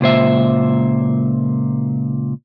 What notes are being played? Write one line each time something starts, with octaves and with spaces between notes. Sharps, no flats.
C#2 A#2 C5 E5